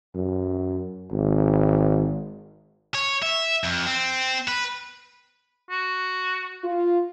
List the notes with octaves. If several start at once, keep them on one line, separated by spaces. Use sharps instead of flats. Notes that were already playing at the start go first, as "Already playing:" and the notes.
F#2
G#1
C#5
E5
F2
C4
B4
F#4
F4